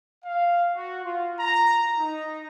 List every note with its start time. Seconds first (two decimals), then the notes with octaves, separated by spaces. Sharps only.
0.24 F5
0.76 F#4
1.04 F4
1.40 A#5
1.99 D#4